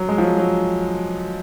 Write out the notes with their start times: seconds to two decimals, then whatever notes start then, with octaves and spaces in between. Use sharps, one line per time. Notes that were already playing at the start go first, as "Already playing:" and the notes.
Already playing: F#3
0.09 G#3
0.18 F3
0.24 F#3
0.38 F#3